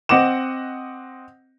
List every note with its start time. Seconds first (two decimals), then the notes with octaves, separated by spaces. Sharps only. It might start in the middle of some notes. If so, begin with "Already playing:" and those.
0.09 C4 D#5 F#5 D6 E7